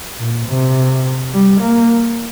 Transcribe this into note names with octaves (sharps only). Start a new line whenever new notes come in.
A#2
C3
G3
A#3